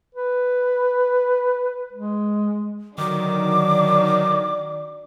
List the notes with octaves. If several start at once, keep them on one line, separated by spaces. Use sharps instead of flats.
B4
G#3
D3 D#3 F#3 D4 D6